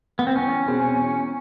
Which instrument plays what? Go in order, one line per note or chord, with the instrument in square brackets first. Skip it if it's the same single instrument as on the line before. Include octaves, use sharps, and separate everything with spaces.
[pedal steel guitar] B3
C4
[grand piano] E2 [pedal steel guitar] C#4
[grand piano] B2 G#3 C4
E2